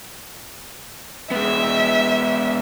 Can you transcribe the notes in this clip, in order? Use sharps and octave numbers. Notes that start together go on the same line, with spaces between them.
G#3 B3 E5